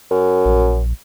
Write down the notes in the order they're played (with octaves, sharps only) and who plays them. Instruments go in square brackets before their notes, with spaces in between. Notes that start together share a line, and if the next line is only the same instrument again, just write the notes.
[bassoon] F#2
[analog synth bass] A#1